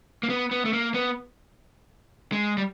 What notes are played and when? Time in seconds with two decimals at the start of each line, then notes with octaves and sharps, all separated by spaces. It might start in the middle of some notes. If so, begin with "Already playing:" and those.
0.23 A#3
0.29 B3
0.51 B3
0.65 A3
0.73 A#3
0.94 B3
2.32 G#3
2.58 G3